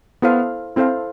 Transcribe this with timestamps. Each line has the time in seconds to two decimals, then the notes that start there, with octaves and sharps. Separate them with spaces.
0.22 B3 E4 A4 C5 F5
0.76 C4 E4 A4 C5 F5